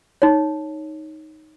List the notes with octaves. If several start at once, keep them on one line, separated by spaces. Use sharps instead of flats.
D#4 C#5